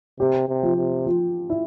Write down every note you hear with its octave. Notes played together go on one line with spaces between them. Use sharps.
C3 G4
C3
F3
C3
F3
E4